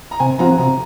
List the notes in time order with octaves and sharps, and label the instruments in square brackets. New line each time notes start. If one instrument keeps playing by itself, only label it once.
[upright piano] A#5
[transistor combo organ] C3 [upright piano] G#5
[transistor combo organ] F3 C4 F#4 [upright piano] A#5
[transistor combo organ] C3 [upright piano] A#5